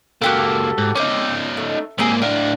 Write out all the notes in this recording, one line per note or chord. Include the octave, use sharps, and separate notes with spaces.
C#2 A#3 F#4 G4 A4
G#2
C4 C#4 D#4 D6
A3
G#2 A#3 C4 G4 G#4
A2 D4 F5